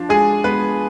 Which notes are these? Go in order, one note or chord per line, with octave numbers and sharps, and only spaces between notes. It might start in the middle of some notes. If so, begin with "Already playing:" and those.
Already playing: F3 D4 F4
G#3 G#4 G#5
G#3 B3 B4